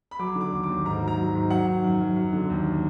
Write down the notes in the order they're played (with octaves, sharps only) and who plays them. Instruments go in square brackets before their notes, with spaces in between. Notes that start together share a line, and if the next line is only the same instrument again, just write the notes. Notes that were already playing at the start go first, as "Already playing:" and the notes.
[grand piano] B5
F#3 D6
D3
D6
D#2
D6
D#2
G#2 A#5
F#3
A#5
F#3
G#2
F#3 F#5
D#3
F#2
F#2
F#3
D3
D#2